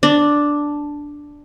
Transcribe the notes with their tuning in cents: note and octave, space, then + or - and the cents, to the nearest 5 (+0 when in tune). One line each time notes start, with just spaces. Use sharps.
D4 +0